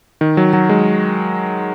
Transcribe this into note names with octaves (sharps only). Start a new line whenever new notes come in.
D#3
F#3
F#3
G#3